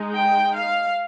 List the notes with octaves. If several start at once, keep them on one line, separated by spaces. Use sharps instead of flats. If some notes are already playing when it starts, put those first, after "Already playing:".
Already playing: G#3 D#4
G5
F5